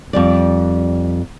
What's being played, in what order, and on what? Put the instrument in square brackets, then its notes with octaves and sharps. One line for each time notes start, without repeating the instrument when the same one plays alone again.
[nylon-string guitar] F2 G3 D5